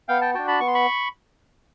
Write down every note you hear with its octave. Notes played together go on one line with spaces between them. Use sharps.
B3 F5 G5
G5 A5
D4 F#4 G5 A5
A5 B5
B3 C#6
C6
B5 C#6